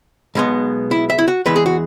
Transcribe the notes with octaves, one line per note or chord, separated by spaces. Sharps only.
B1 B2 G#3 B3
E4
E5
E4
F#4
E2 E3 G#3 B4
G#4
F#4